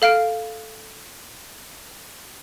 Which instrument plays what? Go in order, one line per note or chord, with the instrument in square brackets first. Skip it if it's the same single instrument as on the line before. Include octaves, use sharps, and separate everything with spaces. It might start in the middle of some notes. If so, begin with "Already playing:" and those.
[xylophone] A4 F5 F6 D7